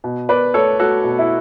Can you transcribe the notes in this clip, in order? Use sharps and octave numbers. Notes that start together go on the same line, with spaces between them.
B2
B2 B4 D5
A3 A4 C#5
A3 F#4 A4
B2
E4